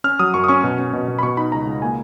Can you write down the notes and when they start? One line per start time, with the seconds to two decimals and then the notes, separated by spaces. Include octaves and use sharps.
0.04 C#4 F6
0.19 F#3 D#6
0.34 F#2 C#6
0.44 D#6
0.48 C#4 C#6
0.64 B2
0.79 C#4
0.93 B2
1.08 B2
1.19 B5
1.23 B2 C#6
1.37 D#4 B5
1.52 C#2 A#5
1.67 C#2
1.82 A#3 G#5